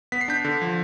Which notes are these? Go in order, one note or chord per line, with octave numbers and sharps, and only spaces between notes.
B3 B6
C7
D4 G6 B6
D3
F3